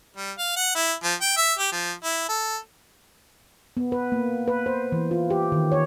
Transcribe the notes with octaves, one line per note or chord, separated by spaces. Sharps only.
G3
F5
F#5
E4
F3
G5
E5
G4
F3
E4
A4
B3
B4
A#3
B4
C5
E3
F4
G4
D#3
C#5